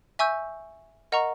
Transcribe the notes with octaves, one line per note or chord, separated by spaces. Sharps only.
E5 G#5 C#6 E6 G6
A#4 D#5 F#5 A#5 C#6